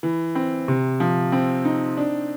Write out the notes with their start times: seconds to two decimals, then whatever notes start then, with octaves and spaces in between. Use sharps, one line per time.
0.03 E3
0.35 C4
0.68 C3
1.00 F3
1.32 C4
1.65 D#4
1.97 D4